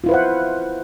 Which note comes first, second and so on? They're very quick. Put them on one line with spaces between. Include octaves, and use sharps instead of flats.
F4 E4 B4 C5 F#5